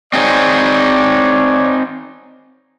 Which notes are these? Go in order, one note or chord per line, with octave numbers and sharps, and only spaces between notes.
C4 D#4 G#4 C#5 D5